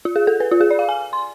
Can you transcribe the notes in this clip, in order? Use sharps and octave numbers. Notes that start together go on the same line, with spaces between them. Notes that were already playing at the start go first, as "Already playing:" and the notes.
F4
G#4
A4
B4
F4
G#4
D5
F5
G#5
C6